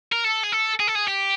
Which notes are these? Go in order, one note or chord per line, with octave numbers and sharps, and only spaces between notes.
A#4
A4
G#4
A4
G#4
A4
G#4
G4